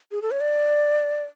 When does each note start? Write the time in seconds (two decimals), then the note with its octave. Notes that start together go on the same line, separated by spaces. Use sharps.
0.12 G#4
0.22 A4
0.31 C#5
0.41 D5